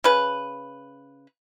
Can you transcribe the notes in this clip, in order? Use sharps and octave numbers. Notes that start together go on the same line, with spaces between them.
C#3 B4